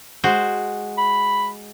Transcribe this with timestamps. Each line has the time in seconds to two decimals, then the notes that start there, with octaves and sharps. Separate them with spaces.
0.24 G#3 F#4 C5
0.98 B5